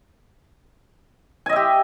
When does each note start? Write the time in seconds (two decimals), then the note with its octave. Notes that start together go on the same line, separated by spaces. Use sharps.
1.46 G#5
1.49 D#5
1.53 E5
1.56 G4